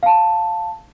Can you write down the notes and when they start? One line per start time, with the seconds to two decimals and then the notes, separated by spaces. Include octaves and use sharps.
0.03 F5 A5